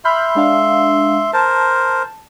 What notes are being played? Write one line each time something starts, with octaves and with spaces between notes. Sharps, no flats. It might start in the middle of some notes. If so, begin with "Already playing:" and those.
E5 B5 C6 F6 G6
G#3 D4 F5
A#4 C5 A5